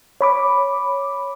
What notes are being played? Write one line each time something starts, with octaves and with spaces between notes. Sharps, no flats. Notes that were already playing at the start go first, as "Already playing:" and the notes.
C#5 B5 D6